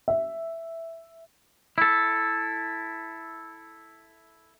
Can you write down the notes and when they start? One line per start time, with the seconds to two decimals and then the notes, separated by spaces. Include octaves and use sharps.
0.08 E5
1.78 E4 A4